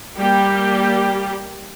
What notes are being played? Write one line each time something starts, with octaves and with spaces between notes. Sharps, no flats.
G3 A#3 G4